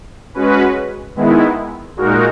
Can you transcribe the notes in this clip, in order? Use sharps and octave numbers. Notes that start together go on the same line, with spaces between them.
G#3 C#4 F#4 B4
D#3 G#3 B3 E4
A#2 G#3 D#4 F#4 A#4